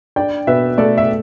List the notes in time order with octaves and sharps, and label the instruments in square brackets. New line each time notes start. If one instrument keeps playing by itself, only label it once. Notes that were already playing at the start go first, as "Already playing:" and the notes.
[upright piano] D4 D5 G5
B2 B4 E5
A3 A4 D5
E5